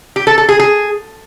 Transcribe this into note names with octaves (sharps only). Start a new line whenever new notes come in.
G4
A4
A4
G#4
G#4